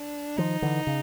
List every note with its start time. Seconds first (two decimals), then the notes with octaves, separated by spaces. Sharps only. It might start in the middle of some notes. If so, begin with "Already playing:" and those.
Already playing: D4
0.38 D#3 F3 D#4
0.62 D3 E3
0.87 C#3